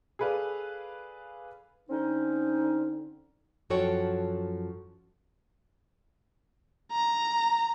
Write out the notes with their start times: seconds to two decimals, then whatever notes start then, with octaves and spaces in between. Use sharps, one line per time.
0.19 G#4 A4 B4 D5 F5
1.90 D3 C4 C#4 D#4
3.70 F#2 F3 F#4 A4 C#5 G5
6.92 A#5